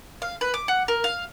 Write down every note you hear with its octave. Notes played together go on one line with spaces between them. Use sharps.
F5
B4
D6
F#5
A#4
F5